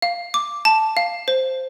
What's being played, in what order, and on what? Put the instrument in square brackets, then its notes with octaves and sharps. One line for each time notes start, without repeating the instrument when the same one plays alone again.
[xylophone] F5
D6
A5
F5
C5